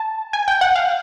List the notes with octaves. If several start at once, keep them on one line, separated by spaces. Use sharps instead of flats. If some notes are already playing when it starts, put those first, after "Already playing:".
Already playing: A5
G#5
G5
F#5
F5